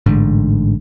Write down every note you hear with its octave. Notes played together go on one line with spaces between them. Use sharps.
A1 G#2 D3